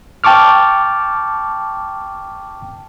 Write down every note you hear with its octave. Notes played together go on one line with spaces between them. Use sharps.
G5 A5 C#6 D6 F6